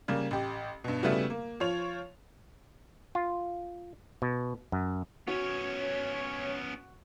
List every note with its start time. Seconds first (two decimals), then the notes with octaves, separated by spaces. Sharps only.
0.08 C#3 G3 A#3
0.31 A1 G4
0.84 G2 B2
1.03 C#3 G3 A3 B3 E4 F#4
1.30 A#3
1.60 F3 F4 C#5 F7
3.15 F4
4.22 B2
4.72 F#2
5.27 B3 C#4 F#4 C#5